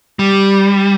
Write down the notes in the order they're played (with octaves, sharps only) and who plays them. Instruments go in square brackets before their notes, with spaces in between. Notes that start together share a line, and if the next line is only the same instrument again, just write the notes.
[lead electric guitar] G3